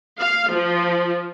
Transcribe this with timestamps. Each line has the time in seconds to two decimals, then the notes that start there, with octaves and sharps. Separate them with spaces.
0.19 F5
0.53 F3